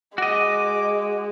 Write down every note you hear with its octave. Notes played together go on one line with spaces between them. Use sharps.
G#3 F#4 D#5 D6